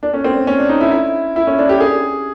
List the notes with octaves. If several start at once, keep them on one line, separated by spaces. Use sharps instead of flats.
D4
C#4
C4
C#4
D4
D#4
E4
E4
E4
C#4
D4
G4
G#4